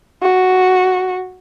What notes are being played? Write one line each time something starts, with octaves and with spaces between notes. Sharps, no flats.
F#4